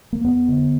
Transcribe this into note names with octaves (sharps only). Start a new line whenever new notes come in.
A#3
F2 B3
D3